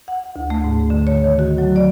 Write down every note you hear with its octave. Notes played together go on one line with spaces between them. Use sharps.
F#5
D2
A3
G#2
D3
C#5
D#3
F#4
F#3
D5